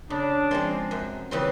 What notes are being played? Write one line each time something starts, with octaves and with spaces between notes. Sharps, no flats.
C#3 D4
F3 G#3 C4
F#2
C#3 E3 G3 C4